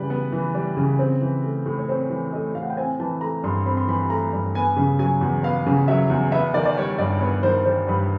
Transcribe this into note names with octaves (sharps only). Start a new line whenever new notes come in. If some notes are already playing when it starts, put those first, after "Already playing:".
Already playing: C#3 E3 G3 B4
B3
E3
G3
C#3
C4
E3
A3
A2
C#5
C4 C5
E3
A3 D#5
A2 F5
F#5
G5
C4 G#5
E3 A5
A3 A#5
G2 C6
C4 B5
C6
E3 B5
A3 A#5
G2
B3 G#5
C#3
F#3 G#5
E2
B3 F5
C#3
F#3 E5
E2
B3 E5
D#3 D5
D5
G3 C#5
G2 D5
B3 C#5
D#3 C5
G3 C5
G2 B4